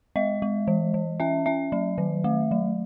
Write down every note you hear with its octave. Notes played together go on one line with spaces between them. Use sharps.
G#3 D#5
G#3
E3
E3
C#4 E5
C#4 E5
F#3
D#3
A3
F#3